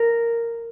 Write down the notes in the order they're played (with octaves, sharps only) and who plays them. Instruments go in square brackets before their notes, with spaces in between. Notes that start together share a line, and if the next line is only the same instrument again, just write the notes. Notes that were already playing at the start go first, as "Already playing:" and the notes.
Already playing: [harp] A#4